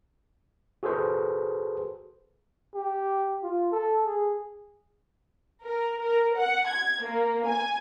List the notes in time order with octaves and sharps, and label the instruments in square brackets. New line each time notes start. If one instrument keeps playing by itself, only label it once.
[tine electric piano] F#4 G#4 A4 B4 C5
[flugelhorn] G4
F4
A4
G#4
[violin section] A#4
A#4
F#5
G#6
A#3
G#5